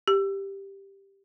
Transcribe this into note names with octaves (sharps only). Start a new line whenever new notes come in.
G4